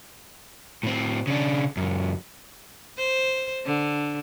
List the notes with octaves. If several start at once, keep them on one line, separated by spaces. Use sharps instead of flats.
A2 C4
C#3 D4
C#2 F#2
C5
D3